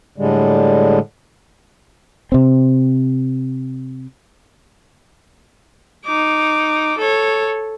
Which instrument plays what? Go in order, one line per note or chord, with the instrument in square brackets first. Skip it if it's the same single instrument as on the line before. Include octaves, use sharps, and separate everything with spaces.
[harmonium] A2 D3 G3 G#3
[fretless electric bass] C3 C4
[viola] D#4 D6
A4 C#5